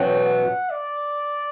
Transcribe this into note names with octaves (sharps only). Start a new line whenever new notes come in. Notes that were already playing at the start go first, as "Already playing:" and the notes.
Already playing: E2 B2 F#3 C#4 F#4 G5
F#5
D5